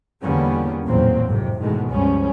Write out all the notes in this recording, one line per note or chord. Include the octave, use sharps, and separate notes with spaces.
E2 D3 G3 A#3 B3 C#4
A1 E2 A#2 F#3 A#3 C4
G#1 F2 A2 C3
E2 G#2 B2 D#3 G#3 A3
C#2 G2 F3 G3 C#4